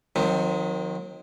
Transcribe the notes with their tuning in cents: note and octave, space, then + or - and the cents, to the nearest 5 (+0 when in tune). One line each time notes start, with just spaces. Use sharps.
D#3 +0 F#3 -40 C4 +0